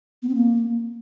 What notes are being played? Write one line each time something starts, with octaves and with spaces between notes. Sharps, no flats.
B3
C4
A#3